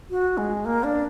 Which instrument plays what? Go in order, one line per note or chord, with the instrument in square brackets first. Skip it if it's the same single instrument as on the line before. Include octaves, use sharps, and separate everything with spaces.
[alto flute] F#4
G#3
A#3
D4